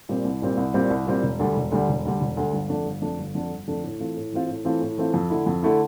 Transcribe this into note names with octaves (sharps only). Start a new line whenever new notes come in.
A#2 G3 C4
C2
A#2 G3 C4
C2
A#2 G3 C4
C2
A#2 G3 C4
E1
D2 D3 G3
E1
D2 D3 G3
E1
D2 D3 G3
E1
D2 D3 G3
G1
F2 D3 A3 D4
G1
F2 D3 A3 D4
G1
F2 D3 A3 D4
G1
F2 D3 A3 D4
A2
E3 A3 C4 F4
A2
E3 A3 C4 F4
A2
E3 A3 C4 F4
A2
E3 A3 C4 F4
F2
D3 A3 E4
F2
D3 A3 E4